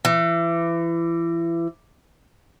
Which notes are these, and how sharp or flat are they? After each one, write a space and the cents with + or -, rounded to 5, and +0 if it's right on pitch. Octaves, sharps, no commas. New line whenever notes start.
E3 +30